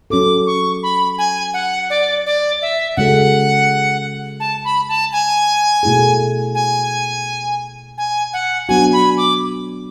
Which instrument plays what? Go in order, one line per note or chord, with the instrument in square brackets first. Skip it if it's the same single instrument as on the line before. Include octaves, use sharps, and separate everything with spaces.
[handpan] F#3 C#4 F#4 A4 [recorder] D6
[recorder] C#6
B5
G#5
F#5
D5
D5
E5
[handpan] C#3 G#3 C#4 F#4 A4 [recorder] F#5
[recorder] A5
B5
A5
G#5
[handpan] B2 A3 E4 G#4
[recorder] G#5
G#5
F#5
[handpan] F#3 B3 D4 F#4 [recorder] G#5
[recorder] B5
D6